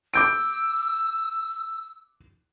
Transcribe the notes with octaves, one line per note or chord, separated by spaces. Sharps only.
D6 E6 G6 D7